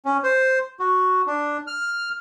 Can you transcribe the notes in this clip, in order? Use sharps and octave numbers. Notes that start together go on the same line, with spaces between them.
C#4
C5
F#4
D4
F6